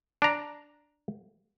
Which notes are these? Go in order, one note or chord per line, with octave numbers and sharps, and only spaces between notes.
D4 A#5